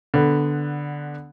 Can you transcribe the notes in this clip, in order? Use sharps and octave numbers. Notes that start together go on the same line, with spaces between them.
D3 B3